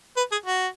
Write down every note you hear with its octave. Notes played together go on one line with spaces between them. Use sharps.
B4
G#4
F#4